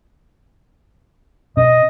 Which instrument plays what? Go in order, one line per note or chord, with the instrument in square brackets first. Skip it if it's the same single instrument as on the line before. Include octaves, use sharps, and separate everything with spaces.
[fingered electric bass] B2 C#4 [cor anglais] D#5